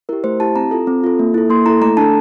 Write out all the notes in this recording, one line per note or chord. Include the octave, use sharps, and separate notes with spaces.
E4 G4 A#4
A3 C5
E4 G4 A5
C4 A#5
F4 A4
C4
F4 A4
A#3
E4 A4
A#3 C6
E4 A4 A#5
A3 A#5
D4 A4 A5